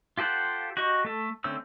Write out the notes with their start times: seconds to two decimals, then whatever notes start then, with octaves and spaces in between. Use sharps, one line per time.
0.18 F4 G4 A4 C5 F#5
0.77 F#4 G4 D#5 C#6
1.05 A3 A4
1.44 D3 A3 C4 C#4 E6